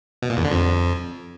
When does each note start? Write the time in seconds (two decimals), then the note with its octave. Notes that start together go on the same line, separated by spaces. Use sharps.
0.22 B2
0.30 A#2
0.37 E2
0.44 D3
0.51 F2